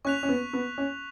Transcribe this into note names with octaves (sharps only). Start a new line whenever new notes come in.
C#4 C#6 F#6 B6 F7
C#4
B3
B3
C#4